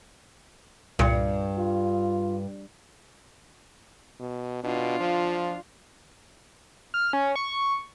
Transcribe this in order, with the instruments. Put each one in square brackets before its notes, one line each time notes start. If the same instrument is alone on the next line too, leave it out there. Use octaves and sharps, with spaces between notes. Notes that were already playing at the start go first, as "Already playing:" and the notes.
[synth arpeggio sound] C2 A#2 C#7 [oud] G2
[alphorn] F4
[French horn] B2
[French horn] B2 [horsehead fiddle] D4 F4
[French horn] F3
[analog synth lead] F6
C#4
C#6